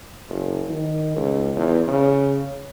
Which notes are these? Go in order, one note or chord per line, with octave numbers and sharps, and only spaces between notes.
F#1
D#3
C#2
E2
C#3